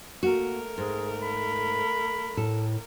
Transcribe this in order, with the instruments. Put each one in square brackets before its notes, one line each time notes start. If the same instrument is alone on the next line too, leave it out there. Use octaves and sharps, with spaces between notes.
[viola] A3 A#4 [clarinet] A#3 [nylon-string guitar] F#4
[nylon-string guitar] G#2 [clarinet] G#4
[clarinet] B5
[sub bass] A2 [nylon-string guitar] A4